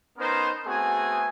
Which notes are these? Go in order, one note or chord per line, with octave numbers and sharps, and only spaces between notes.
B3 C#4 D#4 A#4 C5
A3 B3 C4 F#4 G#4 G#5